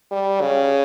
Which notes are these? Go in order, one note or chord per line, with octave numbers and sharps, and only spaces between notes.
G3
C#3